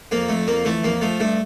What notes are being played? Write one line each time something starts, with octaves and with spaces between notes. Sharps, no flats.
F2 A#3
F2 A3
F2 A#3
E3 A3
F2 A#3
F3 A3
G2 A3